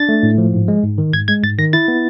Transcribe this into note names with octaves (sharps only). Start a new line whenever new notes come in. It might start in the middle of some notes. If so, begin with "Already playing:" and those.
Already playing: D4 A6
A3
A2
F3
G#2
G#3
G#2
D#3
G#2 G#6
G#3 G#6
G#2 A6
D#3 A#6
E4 A6
B3